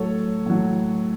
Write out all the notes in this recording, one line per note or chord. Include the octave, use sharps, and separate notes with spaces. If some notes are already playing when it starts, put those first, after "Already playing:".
Already playing: A2 F#3 A4 C#5
A2 F#3